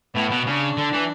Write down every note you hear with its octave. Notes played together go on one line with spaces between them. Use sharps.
A2 B3
B2
C#3 D4
D3
E3